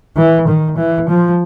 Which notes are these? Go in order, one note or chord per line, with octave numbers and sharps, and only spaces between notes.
E3
D#3
E3
F3